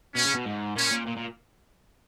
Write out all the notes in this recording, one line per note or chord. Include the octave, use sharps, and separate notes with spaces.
B2 C#4
C#3
B2
G#2
A#2 C#4
A#2
A#2
A#2